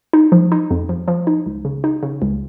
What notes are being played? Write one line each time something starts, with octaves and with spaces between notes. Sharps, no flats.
D#4
F3
D#4
F2
F3
F3
D#4
C#2
C#3
D#4
C#3
C#2